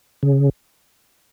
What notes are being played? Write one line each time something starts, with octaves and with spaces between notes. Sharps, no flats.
C#3